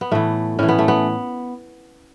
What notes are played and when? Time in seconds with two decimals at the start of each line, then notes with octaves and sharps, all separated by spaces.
0.01 B3
0.11 A2 E3 A3
0.59 A2 E3 C#4
0.68 B3
0.79 A3
0.88 B3